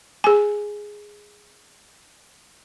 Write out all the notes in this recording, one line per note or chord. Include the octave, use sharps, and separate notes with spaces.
G#4 G#5